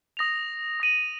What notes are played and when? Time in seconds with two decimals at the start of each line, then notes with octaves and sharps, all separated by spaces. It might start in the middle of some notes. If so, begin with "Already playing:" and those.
0.17 D#6 A#6 F7
0.80 D#6 A#6 D#7 F#7